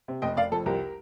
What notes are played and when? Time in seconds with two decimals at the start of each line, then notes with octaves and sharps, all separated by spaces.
0.08 C3
0.22 F1 D#5 G5
0.37 F1 D5 F5
0.52 F2 A4
0.66 C2 G4 A#4